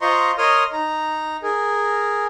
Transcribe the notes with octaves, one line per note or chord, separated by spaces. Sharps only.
F4 C5 D#5 A#5 C6 C#6
A#4 C#5 D#5 C6 D#6 F6
D#4 A#5
G#4 A#4